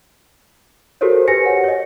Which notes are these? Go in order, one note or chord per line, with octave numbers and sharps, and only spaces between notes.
F#4 G4 A4 A#4 C5 C#5
G4 B4 C#5 G#5 A#6 C#7
F#5
C#5 D#5